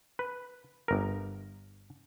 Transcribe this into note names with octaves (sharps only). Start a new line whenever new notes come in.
B4
G1 A#4